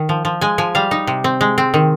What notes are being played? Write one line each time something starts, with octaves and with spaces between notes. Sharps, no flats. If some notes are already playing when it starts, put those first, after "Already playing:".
Already playing: D#3
F3
F3
G#3 G#5
F3 G#5
G3 F5
D#4
C3
C4
G#3
C4
D#3